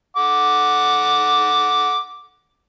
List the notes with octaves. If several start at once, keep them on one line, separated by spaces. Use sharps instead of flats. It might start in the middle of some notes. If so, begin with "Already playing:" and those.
F#5 D6